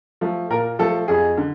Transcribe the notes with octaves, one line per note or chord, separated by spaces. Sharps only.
F3 A3
A#2 A#4
F3 A3 A4
F2 G#4
D3